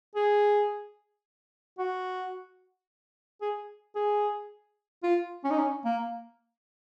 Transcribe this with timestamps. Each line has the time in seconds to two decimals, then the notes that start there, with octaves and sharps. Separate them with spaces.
0.15 G#4
1.78 F#4
3.41 G#4
3.95 G#4
5.03 F4
5.44 C#4
5.51 D#4
5.58 C#4
5.85 A#3